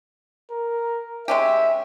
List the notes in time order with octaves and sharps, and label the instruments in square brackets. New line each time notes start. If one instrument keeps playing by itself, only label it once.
[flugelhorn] A#4
[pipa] G#3 C#4 G4 [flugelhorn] E5